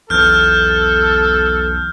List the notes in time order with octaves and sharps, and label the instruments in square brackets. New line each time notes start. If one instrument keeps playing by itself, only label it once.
[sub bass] B1 [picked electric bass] E2 [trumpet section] A4 [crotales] F6 G6